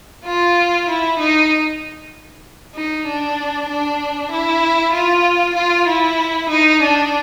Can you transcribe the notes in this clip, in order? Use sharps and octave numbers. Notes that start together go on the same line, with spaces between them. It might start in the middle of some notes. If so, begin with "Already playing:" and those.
F4
E4
D#4
D#4
D4
D4
E4
F4
F4
E4
D#4
D4